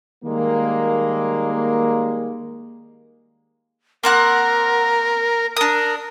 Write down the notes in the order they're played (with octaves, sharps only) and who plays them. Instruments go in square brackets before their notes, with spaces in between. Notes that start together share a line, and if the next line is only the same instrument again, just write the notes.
[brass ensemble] D#3 G3 G#3 A#3
[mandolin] A#3 C4 F#5 [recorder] A#4
[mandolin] D4 D#6 [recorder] A#4